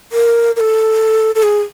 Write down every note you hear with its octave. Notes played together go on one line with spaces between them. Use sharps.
A#4
A#4
A4
A4
G#4